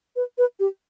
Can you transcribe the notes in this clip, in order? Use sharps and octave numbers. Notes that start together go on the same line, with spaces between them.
B4
B4
G4